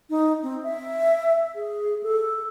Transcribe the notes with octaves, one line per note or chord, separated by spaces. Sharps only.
D#4
C4
E5
G#4
A4